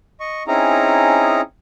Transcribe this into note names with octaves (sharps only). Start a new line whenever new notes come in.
D#5 C#6
C4 C#4 D#4 E4 G#4 A#5